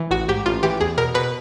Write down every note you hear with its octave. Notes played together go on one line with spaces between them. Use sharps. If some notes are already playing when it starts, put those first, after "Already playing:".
Already playing: E3
A1 F#4
G#2 G4
A1 F4
E3 G4
E2 G#4
B2 A#4
B2 B4